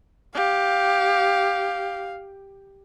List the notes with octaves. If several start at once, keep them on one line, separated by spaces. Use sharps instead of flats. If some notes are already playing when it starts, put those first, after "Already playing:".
G4 F5